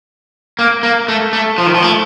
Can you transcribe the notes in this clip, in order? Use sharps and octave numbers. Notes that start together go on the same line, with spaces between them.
A#3
A#3
A3
A3
F3
D#3
F3
A3